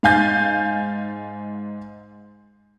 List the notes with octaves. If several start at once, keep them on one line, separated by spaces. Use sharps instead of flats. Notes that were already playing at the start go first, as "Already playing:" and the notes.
G#2 F5 G#5 G6 A6